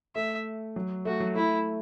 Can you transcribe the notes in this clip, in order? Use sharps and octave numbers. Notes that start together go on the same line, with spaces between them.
A3 E5
F#3
A3 F#4
F#3
A3 E4